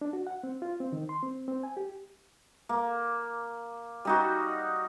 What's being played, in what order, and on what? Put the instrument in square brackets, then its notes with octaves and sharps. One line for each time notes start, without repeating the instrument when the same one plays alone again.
[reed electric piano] D4
F#4
F#5
C4
F4
C4
D#3
C6
C4
C4
G#5
G4
[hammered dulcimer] A#3
G3 D#4 F#4